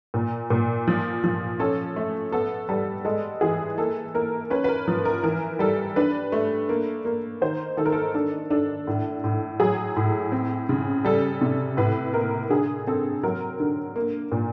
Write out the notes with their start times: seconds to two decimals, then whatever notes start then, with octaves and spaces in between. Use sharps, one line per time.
0.14 A#2
0.50 A#2
0.87 F3
1.24 F3
1.60 C#4 A4
1.96 A3
2.32 B3 A4
2.69 G3 A4
3.05 G#3 A4
3.41 E3 G#4
3.78 A#3 A4
4.15 A#3 A#4
4.50 C#4 B4
4.64 B4
4.69 A#4
4.88 F3
5.05 A#4
5.23 E3 A#4
5.59 G3 A4
5.96 D4 B4
6.32 A3
6.69 A#3
7.05 A#3
7.41 D#3 C5
7.77 D#3 A4
7.86 A#4
7.92 A4
8.14 D4 A4
8.50 D4 A4
8.87 A2
9.24 A2
9.60 F#3 G#4
9.96 A2
10.32 C4
10.69 C#3
11.04 G3 A4
11.41 C3
11.77 A2 B4
12.14 A#3 A#4
12.50 D3 G#4
12.87 C4 A4
13.23 F#3 A#4
13.60 D3
13.96 A#3
14.32 A#2